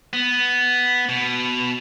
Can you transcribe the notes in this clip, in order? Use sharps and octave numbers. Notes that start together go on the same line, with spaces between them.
B3
B2